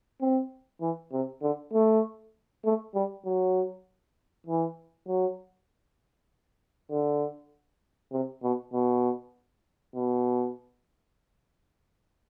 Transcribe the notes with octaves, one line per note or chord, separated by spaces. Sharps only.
C4
E3
C3
D3
A3
A3
G3
F#3
E3
F#3
D3
C3
B2
B2
B2